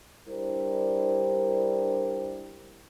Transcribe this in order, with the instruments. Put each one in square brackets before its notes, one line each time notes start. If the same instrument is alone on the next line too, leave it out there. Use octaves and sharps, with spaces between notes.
[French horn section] G3 D4 E4 A#4 C5